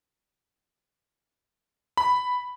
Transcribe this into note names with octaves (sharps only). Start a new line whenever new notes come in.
B5